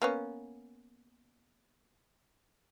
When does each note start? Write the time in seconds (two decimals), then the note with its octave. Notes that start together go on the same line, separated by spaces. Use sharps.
0.02 A#3 B3 C#4